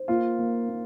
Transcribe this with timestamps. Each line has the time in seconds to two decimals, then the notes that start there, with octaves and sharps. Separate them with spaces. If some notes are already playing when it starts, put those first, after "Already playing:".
Already playing: C5
0.08 A#3 F4
0.39 A#3
0.69 A#3